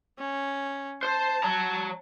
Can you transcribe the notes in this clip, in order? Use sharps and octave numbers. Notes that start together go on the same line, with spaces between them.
C#4
C5 A5
C#5 A#5